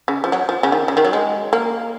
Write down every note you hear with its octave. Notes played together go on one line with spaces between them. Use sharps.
C#3
F3
F#3
F3
C#3
D#3
C#3
D#3
F#3
G#3
A#3